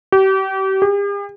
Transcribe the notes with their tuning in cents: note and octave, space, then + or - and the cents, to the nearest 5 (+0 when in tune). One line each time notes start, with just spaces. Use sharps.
G4 -35
G4 +45